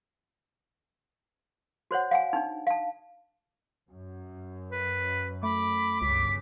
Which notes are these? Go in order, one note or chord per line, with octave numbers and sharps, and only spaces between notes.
F#4 C5 C#5 F#5
F5 F#5 G#5
D4 D#4
F5 A5
F#2
B4
A3 B5 D6
G1 C#2 C#3 B6